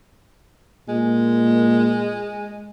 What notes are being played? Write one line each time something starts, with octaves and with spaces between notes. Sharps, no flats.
A#2 G#3